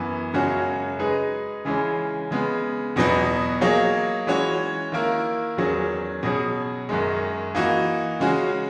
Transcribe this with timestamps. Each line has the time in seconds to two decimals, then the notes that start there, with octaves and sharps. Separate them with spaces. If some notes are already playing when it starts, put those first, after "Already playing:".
Already playing: F#2 E3 B3
0.34 F#2 C#3 G#3 C#4 F#4
0.99 G#3 D#4 G#4 B4
1.65 C#3 E3 G#3 C#4
2.31 C#3 G#3 B3
2.96 E2 B2 F#3 B3 D#4
3.61 F#3 A#3 D#4 G#4 C#5
4.27 E3 G#3 C#4 F#4 C#5
4.92 D#3 A#3 E4 A#4
5.57 E2 D#3 F#3 C#4 G#4
6.23 B2 F#3 C#4 G#4
6.89 F#2 D#3 G#3
7.55 E3 A#3 D#4 F#4
8.20 C#3 G#3 C#4 F#4